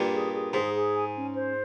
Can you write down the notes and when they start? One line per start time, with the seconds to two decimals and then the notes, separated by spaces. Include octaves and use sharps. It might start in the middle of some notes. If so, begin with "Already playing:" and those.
Already playing: G2 A#2
0.12 G#4
0.33 G#4
0.53 G#2 G#4
0.74 G#4
0.95 G#5
1.15 C#4
1.36 C5